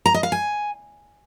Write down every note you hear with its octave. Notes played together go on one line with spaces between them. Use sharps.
A#5
D#5
F5
G#5